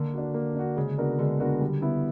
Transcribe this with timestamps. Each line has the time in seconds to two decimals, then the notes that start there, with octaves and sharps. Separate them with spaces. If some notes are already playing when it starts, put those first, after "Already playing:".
Already playing: D3 A#3
0.14 D4 F#4
0.34 A#3
0.55 D4 F#4
0.76 C#3 G#3
0.98 B3 D4 F#4 A#4
1.19 D3 G#3
1.40 B3 D4 F#4 A#4
1.61 G3
1.82 B3 E4